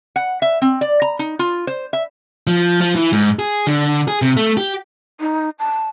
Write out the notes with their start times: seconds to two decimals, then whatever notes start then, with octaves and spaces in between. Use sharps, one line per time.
0.16 F#5
0.42 E5
0.62 C4
0.81 D5
1.02 A#5
1.19 D#4
1.39 F4
1.67 C5
1.93 E5
2.47 F3
2.81 F3
2.95 E3
3.13 G#2
3.39 G#4
3.67 D3
4.08 G#4
4.22 C3
4.37 A3
4.57 G4
5.20 D#4
5.59 A5